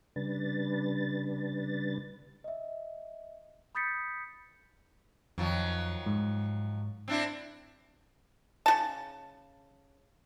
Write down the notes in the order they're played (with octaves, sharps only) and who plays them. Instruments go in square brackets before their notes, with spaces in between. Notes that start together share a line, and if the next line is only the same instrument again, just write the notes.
[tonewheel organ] C#3 G3 D4 B4 A6
[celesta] D#5 E5
B5 D#6 G6 A6 B6 C#7
[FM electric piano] F2 [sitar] D#3 F3 F#3
[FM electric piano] G#2
[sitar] C4 D4 E4
[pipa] C#3 F#4 A5